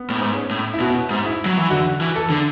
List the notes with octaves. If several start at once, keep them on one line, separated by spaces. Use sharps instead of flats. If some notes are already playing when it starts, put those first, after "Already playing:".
Already playing: B3
A2
G#2
C#4
A2
E4
B2 F#4
G#2
E4
F#3
E3
D3 F#4
E3
A4
D3